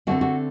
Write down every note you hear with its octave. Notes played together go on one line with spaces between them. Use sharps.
D3 A3 C4 F#4
F#4